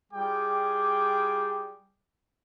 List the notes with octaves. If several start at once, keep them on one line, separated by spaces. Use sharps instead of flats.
G3 F4 G#4 G5 D6